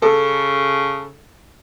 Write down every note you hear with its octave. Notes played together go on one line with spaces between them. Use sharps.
C#3 A4